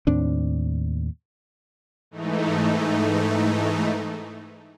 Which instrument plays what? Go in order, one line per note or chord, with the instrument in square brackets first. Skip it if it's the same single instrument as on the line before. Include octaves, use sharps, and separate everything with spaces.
[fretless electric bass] D#2 A2 C4 D4
[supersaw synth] G#2 E3 A3 D#4